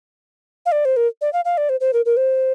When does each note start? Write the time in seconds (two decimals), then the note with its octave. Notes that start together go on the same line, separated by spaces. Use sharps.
0.66 F5
0.72 D5
0.85 C5
0.97 A#4
1.21 D5
1.33 F5
1.45 F5
1.58 D5
1.69 C5
1.80 C5
1.93 A#4
2.06 A#4
2.17 C5